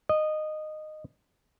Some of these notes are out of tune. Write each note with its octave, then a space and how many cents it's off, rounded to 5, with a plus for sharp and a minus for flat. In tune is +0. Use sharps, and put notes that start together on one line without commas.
D#5 -15